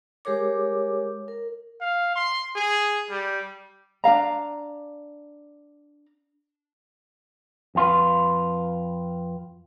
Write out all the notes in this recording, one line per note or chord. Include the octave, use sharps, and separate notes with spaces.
G#3 G4 G#4 A#4 C#5 D6
A#4
F5
C6
G#4
G3
D4 G#4 F5 A#5
F2 F4 B4